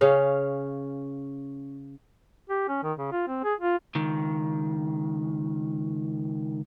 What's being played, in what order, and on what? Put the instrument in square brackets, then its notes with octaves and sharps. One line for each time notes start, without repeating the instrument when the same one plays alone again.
[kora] C#3 C#4 F5
[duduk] G4
C#4
D#3
C#3
F4
C4
G#4
F4
[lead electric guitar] C#2 D#3